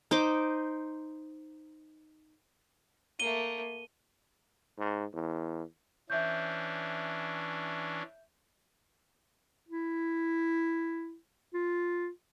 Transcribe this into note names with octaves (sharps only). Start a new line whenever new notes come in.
D#4 C5 D6
A3 A#3 D#7 G7
G#2
E2
E3 C#4 D4 E5 G6
E4
F4